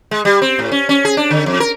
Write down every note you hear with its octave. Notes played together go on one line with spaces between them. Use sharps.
G#3
G3
C4
A2
C#4
C#4
G#4
D4
D3
F2
A#4